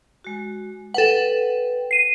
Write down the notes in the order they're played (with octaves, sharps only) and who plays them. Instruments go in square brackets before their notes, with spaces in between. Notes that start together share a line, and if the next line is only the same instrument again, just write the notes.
[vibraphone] G#3 F#4
[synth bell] A4 F#5 [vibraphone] B4 G5
[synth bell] C7 D#7